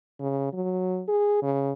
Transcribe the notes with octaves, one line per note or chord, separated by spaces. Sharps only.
C#3
F#3
G#4
C#3